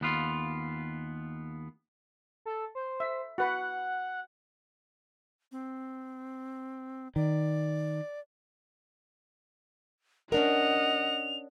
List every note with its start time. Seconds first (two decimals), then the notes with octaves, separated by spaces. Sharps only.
0.01 D#2 B3 F4
2.46 A4
2.75 C5
3.00 E5
3.38 F#4 B4 F#5
5.52 C4
7.16 D#3 D5
10.32 C#4 D4 A#4 D#5 F#5 F7